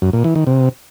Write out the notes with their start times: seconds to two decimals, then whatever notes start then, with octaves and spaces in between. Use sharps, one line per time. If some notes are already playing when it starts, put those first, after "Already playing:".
0.02 F#2
0.13 A#2
0.24 E3
0.36 D#3
0.47 C3